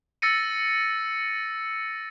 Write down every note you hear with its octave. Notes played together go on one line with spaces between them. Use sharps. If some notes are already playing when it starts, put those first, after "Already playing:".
E6 A6 A#6 C#7 D#7